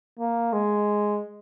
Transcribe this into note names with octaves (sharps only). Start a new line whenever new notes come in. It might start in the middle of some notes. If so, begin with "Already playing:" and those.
A#3
G#3